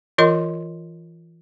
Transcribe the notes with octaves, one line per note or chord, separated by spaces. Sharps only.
E3 F4 A#4 D#5 C6